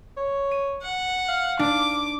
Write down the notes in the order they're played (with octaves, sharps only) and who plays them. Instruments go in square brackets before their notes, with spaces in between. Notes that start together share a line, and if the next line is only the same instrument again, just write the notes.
[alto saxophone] C#5
[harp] D#7
[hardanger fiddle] F#5
[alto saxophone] F5
[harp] D4 [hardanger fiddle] D6